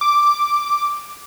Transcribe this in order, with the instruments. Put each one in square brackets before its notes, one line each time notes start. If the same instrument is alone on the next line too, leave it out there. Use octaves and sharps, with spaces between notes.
[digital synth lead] D6